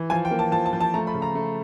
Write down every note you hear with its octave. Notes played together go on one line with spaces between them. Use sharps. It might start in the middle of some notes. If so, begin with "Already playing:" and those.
Already playing: E3
F3 G#5
G5
A#3
A5
F3 A5
A5
F3
A5
A3 A#5
B5
C#3
A#5
A3